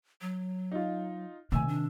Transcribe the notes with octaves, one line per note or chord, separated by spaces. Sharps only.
F#3
D#4 F4
C3 D#3 A3 G#5 E6
D4